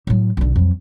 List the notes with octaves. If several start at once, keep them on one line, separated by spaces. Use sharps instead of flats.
A2 F#3
B1 D3
F2 F#3